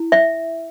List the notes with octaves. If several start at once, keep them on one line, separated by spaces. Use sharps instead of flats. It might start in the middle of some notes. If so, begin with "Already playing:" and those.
Already playing: E4
E5